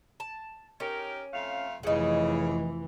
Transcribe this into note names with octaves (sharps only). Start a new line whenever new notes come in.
A5
C#4 D#4 G4 A#4
F2 A3 F5
F1 C#3 E3 D#4 G#4 F#5